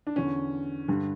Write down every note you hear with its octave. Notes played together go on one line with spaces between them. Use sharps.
D4
E2 D3 C#4
G2 D3